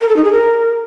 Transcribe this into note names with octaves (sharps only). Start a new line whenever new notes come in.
A#4
A4
D#4
G#4
A#4